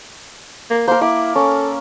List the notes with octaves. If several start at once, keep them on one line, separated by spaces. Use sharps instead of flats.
A#3
A#3 A#4 C5
E4 D6
C#4 A4